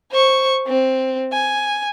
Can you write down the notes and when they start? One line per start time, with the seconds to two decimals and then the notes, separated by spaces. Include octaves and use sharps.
0.12 C5 C#6
0.68 C4
1.32 G#5